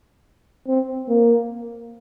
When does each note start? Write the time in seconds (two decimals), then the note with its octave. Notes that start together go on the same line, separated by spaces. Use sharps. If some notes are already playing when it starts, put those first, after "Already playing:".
0.68 C4
1.09 A#3